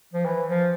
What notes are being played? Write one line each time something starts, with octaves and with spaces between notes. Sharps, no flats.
F3
E3
F3